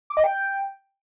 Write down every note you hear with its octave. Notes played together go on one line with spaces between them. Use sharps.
D6
D#5
G5